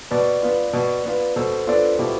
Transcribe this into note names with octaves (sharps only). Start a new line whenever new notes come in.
B2 B4 D5
B3 F4
B2
B3 F4
B2 A4 C5
B3 D4 F4 A4 D5
B2 E4 G4